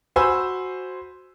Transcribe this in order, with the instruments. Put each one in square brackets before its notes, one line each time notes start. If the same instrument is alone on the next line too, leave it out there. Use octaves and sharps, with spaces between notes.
[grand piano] F#4 C5 G#5 B5 E6